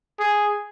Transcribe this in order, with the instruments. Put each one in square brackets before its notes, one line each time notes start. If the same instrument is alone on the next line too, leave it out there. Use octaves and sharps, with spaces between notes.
[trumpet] G#4